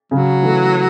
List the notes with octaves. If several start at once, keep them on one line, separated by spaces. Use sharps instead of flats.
C#3 F#3
E3 A3